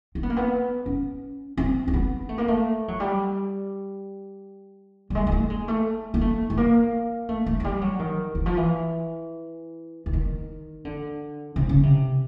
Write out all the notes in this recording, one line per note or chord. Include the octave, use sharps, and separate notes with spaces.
C4
B3
A#3
B3
C#4
C4
C4
B3
A3
A#3
A3
F#3
G3
G3
G#3
A#3
A3
G#3
A3
A#3
A3
A3
A#3
A3
A3
F#3
G3
F#3
D#3
E3
F3
E3
E3
D#3
D3
C3
C#3
C3